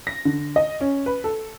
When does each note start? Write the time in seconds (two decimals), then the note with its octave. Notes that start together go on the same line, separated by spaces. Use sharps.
0.07 A#6
0.25 D3
0.56 D#5
0.81 C#4
1.06 B4
1.24 A4